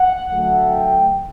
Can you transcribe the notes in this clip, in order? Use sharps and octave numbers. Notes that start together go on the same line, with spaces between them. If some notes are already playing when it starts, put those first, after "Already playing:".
Already playing: F#5
D3 F#3 A3
G5